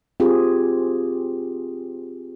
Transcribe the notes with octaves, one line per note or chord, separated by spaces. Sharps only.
C4 F4 G4 G#4